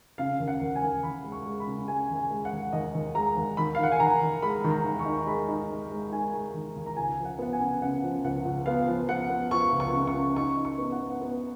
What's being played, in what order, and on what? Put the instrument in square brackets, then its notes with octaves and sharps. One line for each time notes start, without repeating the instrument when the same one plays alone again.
[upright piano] C#3 F5
D#2
F#5
D#2
G#5
D#2
D#2 B5
G#3
C#6
G#3
B5
C#3
G#3 G#5
D#2
G#5
G#3
F#5
D#2
D#2 D#5
D#2
G#3 A#5
D#2
D#3 B5
F5
D#3 F#5
G#5
D#3 A#5
D#3
G#3 B5
D#3
A#5
D#2
C#6
D#4
G#3 B5
D#4
G#3
G#3
D#4 G#5
G#3
D#3
D#2
A#5
C#2 G#5
F3
F#5
B3 F#5
G#5
C#3
C#3 F#5
F3
C#2 F#5
C#2
B3 F5
F3
B3 F#5
B3
F3 C#6
C#2
C#6
C#3
C#6
C#3
D#4 C#6
D#4
C#6
B3
F#5
B3
B3